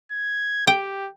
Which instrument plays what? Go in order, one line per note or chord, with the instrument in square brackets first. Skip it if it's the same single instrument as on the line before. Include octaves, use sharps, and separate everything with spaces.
[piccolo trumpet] G#6
[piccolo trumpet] G4 [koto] G5